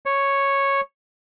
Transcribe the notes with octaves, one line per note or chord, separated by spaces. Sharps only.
C#5